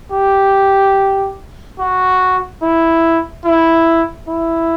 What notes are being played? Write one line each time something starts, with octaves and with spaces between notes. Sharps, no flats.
G4
F#4
E4
E4
E4